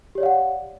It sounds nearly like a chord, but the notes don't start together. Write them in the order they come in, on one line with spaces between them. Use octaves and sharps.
G4 C#5 D5 F5 F#5